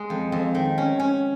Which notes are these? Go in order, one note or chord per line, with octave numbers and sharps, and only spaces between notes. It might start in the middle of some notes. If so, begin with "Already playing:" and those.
Already playing: G#3
F2
F2
D#3
C#4
C#4